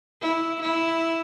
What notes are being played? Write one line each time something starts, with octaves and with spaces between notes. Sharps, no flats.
E4
E4